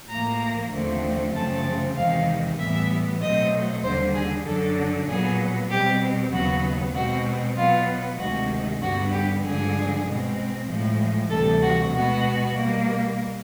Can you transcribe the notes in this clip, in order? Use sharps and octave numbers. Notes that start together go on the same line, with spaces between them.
A2 F3 A#3 A#5
D#2 D3 F3 A3 C4
F#2 C#3 F3 A3 C4 A5
E2 C3 D#3 G#3 F5
A2 E3 G3 B3 E5
B2 F#3 A3 C4 D#5
D#2 D3 G3 C5
G#4
F#2 D3 F#3 A4
A#2 F#3 B3 G#4
B2 G3 C4 G4
D#2 C#3 F#3 B3 F#4
B2 G#3 C4 F#4
B2 F#3 B3 F4
D2 C3 D#3 G#3 F#4
G2 D3 G3 B3 F#4
G4
G2 D3 F3 G#3 G#4
B2 G#3 C4
A2 F3 G#3
D2 C3 E3 G3 A4
F#4
B2 G#3 B3 F#4
B2 G3 A#3